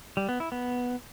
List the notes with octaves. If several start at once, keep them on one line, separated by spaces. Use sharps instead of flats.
G3
B3
E4
B3